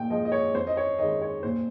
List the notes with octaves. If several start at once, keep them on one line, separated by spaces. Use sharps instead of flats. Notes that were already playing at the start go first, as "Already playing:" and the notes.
Already playing: A#2 G5
F3 G#3 D#5
D#5
C#5
F2 C5
D#5
C#5
D#3 G#3 D#5
C#5
A#2 C5